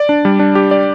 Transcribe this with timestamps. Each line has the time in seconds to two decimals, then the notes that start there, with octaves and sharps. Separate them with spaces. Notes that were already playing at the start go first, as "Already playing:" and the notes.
Already playing: D5
0.09 D4
0.25 G3
0.39 D4
0.55 G4
0.71 D5